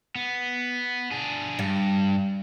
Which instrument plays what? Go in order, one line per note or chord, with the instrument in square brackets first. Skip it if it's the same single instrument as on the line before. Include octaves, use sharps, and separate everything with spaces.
[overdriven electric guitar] B3
D4 G#4
[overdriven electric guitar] G2 [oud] G3